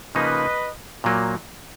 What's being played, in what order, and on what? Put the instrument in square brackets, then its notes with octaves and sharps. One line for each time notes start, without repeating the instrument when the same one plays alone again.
[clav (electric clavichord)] C#3 F3 A#3 D#4 [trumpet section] B4 D#5
[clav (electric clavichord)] A#2 F#3 A#3